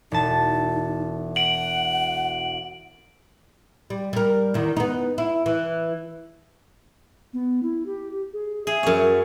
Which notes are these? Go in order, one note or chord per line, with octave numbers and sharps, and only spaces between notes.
E1 D#4 A5
F#5 D7 F#7
G3
G3 A#4
E2 D#3
B3 D#4
E4
E3
B3
E4
G4
G#4
G#4 E5
F#2 C#5